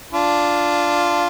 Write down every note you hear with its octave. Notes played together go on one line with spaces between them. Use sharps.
D4 F4